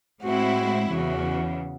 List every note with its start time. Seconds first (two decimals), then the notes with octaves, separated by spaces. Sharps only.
0.23 A2 G#3 C4 E4 F#4
0.89 E2 C#3 E3 F#4